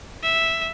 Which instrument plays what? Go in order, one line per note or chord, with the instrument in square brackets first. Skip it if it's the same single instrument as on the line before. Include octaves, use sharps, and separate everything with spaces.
[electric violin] E5